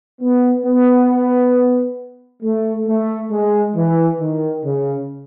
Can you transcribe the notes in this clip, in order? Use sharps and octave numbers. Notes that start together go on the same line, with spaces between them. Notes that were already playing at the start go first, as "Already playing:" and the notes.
B3
B3
A3
A3
G#3
E3
D#3
C#3